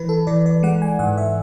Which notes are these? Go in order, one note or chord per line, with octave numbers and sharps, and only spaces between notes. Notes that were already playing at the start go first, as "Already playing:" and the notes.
Already playing: E3 B4
A4
E3 D5
D5
G#3 F#5
G#5
G#2 F#5
E5